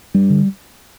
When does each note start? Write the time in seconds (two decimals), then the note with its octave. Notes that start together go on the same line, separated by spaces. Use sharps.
0.14 G2 G3
0.30 D3